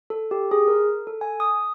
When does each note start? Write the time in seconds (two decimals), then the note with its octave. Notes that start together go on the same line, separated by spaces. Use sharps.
0.10 A4
0.31 G4
0.51 G#4
0.68 A#4
1.07 A4
1.21 G#5
1.40 D#6